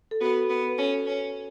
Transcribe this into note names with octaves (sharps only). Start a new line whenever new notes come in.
A4
B3 F#4
B3
B4
C#4 A4
C#4